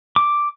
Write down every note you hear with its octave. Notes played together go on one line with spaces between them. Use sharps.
D6